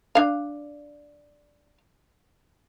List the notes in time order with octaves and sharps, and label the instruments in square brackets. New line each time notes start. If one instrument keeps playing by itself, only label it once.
[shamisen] D4 F5